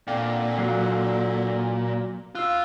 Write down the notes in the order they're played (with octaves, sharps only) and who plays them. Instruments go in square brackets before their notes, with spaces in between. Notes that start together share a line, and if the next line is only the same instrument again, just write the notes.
[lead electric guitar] A#2 [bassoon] D3 [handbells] C4 F5 C7
[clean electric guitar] F#3 [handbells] F5
[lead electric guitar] F4 [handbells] F5 E6 F#6